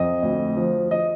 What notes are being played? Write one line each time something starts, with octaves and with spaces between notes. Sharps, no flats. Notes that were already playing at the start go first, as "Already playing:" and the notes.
Already playing: F2 D#5
D2
F3
F3 D#5